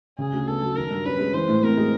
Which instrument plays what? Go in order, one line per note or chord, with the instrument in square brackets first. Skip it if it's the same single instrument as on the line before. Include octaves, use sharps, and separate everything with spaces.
[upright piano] C#3 [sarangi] G#4
[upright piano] D2
[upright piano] B3 [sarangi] A4
[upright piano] F#3
[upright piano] D#3 [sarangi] A#4
[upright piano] G2
[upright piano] C#4 [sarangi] B4
[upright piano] G#3
[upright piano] E3 [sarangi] C5
[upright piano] A2
[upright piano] C4 [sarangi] A#4
[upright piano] G#3